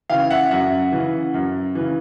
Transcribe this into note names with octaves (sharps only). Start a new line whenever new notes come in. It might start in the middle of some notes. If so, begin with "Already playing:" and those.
C#3 E3 F5 G5
E5 F#5
F#2 E5 F#5
C#3 E3
F#2
C#3 E3